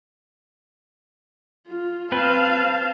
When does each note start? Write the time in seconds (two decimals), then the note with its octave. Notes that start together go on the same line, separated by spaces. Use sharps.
1.67 F4
2.12 C4 B4 F5 A5